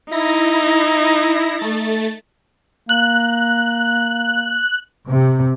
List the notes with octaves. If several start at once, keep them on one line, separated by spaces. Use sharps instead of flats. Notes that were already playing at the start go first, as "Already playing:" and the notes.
D#4 E4 A#6
A3 A6
A#3 F#6
C3